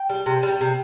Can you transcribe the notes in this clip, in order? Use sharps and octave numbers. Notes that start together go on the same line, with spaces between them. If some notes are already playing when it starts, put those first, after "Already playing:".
Already playing: G5
G3
C3
G3
C3